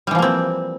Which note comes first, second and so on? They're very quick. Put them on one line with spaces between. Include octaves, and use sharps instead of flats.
G3 E3 F3 A#3 C4